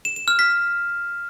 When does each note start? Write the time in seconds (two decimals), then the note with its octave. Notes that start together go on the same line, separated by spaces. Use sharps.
0.05 E7
0.16 E7
0.28 F6
0.39 B6